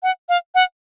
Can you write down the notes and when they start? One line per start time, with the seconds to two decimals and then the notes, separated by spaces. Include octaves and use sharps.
0.03 F#5
0.29 F5
0.55 F#5